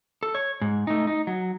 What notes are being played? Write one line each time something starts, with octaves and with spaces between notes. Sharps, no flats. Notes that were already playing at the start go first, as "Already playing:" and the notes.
A4
C#5
G#2
A3 D#4
D#4
F#3